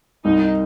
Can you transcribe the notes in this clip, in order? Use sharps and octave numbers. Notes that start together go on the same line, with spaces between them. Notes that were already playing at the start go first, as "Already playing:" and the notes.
C2 D#4